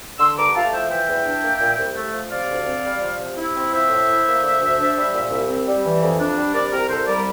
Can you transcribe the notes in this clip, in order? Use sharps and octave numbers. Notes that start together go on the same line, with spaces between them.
D3 C6 E6
G2 A#5 D6
A3 F5 A5
F3 E5 G5
E3 E5 G5
E2
D4
A#3
A#2
C2
A3
F3
C3 D5 F5
D2
C4
G3
F3
C3
E4
C4
F3 C5 E5
A2
E4
A#3
D3
D2
D4
G3
A#2
C2
C4
G3
E3
F2
D4
G3
C3 A#4 D5
C2 G4 A#4
C2 A4 C5
G3 A#4 D5